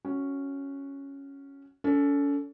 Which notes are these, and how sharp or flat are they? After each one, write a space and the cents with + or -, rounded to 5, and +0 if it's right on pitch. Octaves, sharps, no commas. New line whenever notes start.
C#4 +0 F#4 +0
C#4 +40 A4 +10